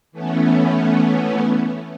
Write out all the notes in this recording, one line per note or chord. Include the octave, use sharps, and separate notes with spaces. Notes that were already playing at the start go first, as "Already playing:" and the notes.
E3 A3 B3 C#4